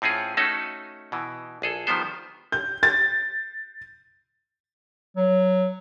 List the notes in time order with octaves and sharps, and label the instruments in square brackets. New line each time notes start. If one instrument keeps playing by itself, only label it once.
[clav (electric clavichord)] A2 C4 C#4 F4 G#4
A3 C#4 D#4 F#4 A4
B2 E3
A#1 G#4 A4
D#3 F3 G3 B3 C5
[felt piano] G6
A6
[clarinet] F#3